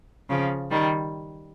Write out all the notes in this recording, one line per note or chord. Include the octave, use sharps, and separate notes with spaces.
C#3 F3
D#3 G3